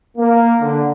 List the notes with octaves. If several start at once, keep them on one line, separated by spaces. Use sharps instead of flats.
A#3
D3